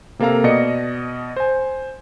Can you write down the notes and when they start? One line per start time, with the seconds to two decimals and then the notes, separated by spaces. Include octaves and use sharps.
0.19 C3 A#3 A4 F5 A#5
0.44 B2 D5 D#5 C#7
1.36 C5 G#5